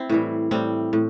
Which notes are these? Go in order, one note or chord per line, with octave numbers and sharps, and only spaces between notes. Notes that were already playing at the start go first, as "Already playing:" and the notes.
Already playing: C4 E4
A2 E3 G3
A2 G3 C4
A2